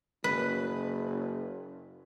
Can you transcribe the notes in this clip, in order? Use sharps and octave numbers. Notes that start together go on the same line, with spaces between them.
F#1 B4